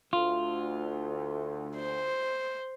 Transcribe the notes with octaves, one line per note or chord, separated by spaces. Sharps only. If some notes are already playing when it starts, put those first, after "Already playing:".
D2 F4
C5